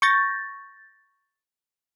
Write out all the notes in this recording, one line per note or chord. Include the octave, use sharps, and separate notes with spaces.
C#6 G6 A6 A#6